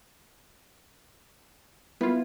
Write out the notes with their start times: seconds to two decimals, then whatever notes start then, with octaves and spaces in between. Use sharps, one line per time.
2.01 B3 E4 F4 B4